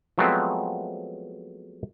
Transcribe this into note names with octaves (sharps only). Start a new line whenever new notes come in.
F3 F#3 G#3 A3 B3 C4